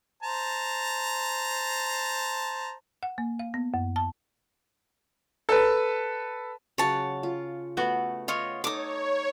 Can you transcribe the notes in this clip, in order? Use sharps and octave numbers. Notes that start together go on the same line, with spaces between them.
C5 A5 A#5
F#5
A#3
F5
B3
F#2
A5
A4 B4
C#3 F#3 C#5 F#5 A5
F4
A3 B3 F#4
F4 C#5 D#5
D#4 A4 C#5 D6 D#6